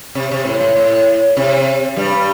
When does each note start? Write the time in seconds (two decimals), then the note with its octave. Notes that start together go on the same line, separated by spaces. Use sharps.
0.15 C3
0.31 C3
0.46 A2
0.60 A2
0.76 A2
1.37 C3
1.96 G2 G3